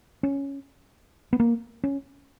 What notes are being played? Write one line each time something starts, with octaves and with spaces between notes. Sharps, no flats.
C#4
B3
A#3
C#4